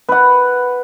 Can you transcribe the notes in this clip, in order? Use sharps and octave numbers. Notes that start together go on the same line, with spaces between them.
B4 F#5